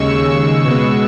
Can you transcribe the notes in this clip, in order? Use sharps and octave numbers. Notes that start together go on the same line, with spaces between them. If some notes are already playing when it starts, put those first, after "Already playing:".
Already playing: D#2 C#3 G#3 C#6 E6
B2 G#3 B3